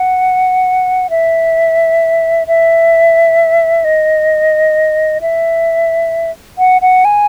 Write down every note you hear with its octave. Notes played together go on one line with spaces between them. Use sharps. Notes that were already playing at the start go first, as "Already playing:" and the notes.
Already playing: F#5
E5
E5
D#5
E5
F#5
F#5
G#5